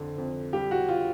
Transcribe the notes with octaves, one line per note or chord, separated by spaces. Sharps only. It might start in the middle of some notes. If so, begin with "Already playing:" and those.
Already playing: F2 D3
F2
G3 G4
F#4
F4